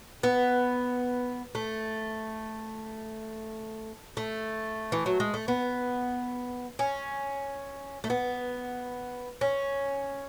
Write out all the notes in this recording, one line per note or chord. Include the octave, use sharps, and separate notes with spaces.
B3
A3
A3
E3
F#3
G#3
A3
B3
C#4
A3
B3
C#4